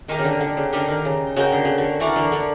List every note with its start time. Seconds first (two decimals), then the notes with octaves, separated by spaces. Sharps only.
0.08 D#3 A#3 D#4 G4 A#4
0.19 C#3
0.24 D3
0.41 D3
0.57 C#3
0.73 D3 D#4 G4 A#4
0.88 D#3
1.05 C#3
1.36 C#3 F#4 A#4 D#5 G5
1.52 D3
1.65 C#3
1.78 D3
2.00 E3 D4 F#4 A#4 D5
2.16 D3
2.32 D3